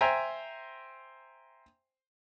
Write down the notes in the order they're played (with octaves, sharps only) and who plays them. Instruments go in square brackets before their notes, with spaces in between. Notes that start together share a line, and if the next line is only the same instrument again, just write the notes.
[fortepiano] C5 E5 G5 G#5 A#5